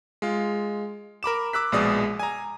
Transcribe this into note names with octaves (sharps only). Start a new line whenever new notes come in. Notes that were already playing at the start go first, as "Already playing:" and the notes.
G#3 F4
A#4 B5 D6 E7
D6 E6 F#6 B6
A#1 B2 G#3 D5 D#6
G#5 A#5